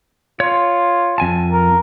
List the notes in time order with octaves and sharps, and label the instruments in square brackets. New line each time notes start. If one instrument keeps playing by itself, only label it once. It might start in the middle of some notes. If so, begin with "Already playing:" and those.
[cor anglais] F4 [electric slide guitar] C#5
[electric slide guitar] F2 G#5 A5
[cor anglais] A#4